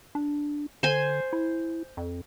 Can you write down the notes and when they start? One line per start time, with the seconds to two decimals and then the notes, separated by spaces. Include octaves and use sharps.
0.15 D4
0.83 D3 C5 G#5
1.33 E4
1.97 F2